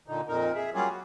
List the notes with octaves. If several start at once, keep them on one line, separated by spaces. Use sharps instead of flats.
A#2 D3 D#4
F2 A#2 D#4 A#4
G#4 E5
F#3 G3 A#3 C#4 F4 G#4
F#4